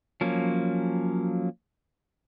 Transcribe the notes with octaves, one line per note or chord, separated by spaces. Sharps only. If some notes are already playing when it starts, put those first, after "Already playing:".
F3 F#3 A#3 C#4